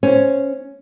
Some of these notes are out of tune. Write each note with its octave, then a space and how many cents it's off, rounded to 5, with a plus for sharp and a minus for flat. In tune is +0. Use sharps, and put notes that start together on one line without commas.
C#4 +0 C5 +0